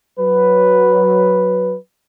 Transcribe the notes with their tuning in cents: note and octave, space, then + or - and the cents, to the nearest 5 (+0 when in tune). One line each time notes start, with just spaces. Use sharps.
F#3 +0 B4 +0